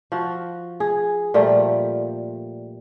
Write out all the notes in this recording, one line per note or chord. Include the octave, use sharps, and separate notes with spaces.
F3 F#4
G#4
A#2 F3 G3 A3